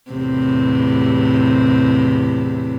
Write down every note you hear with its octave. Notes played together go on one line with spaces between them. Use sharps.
E2 A2 C3